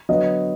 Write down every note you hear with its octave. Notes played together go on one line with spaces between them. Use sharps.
D3 F#3 B3 D#5